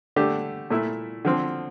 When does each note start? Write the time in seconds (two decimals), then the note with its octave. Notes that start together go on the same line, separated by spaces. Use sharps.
0.16 D3 A3 D4 G4
0.70 A#2 A3 E4
1.25 D3 F3 C4